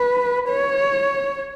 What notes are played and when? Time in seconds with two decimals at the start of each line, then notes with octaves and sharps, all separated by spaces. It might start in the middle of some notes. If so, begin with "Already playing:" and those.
Already playing: B4
0.49 C#5